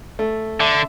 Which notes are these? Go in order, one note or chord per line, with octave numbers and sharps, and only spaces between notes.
A3
D3 E5